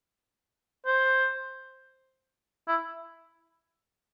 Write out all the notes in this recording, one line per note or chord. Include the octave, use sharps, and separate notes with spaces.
C5
E4